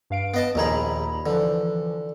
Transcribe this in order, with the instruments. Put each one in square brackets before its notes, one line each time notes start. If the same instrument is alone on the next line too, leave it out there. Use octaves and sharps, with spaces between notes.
[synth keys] G2 F5 D7
[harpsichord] B3 D#5 A5
[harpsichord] A#1 D#3 G#4 [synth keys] D#2 A#5 B5
[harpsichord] D3 [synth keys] E3 F3